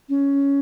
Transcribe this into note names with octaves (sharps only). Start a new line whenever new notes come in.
C#4